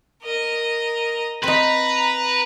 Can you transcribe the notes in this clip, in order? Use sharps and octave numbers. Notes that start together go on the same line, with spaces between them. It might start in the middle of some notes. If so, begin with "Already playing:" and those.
A#4 D#5
C4 D#4 B4 A#5 B5